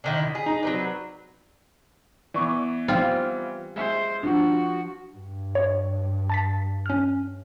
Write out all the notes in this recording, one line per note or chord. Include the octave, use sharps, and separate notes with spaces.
D3 D#3 E4
B6
G#4
D#4 A#5
F#3 C4 B4 D5
E3 B3 D5 C#6 D6
G3 C4 F4
G#3 C5 E5
F3 D4 F#4
G2
C#5
A5 A6 B6
C#4 F6